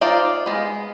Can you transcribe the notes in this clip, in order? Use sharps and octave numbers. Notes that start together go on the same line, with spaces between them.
D#4 F4 C5 D5 F5
G#3 B3